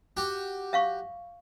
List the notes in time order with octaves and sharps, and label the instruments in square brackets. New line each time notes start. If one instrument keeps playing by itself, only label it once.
[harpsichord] F#4 G4 G5
[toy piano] E5 F5 C#6